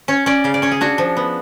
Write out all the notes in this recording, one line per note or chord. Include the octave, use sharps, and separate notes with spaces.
C#4 C#5
C#4 D5
C#3 F5
D5
C#4 C#5
G#4
D4 F#4
F3
B3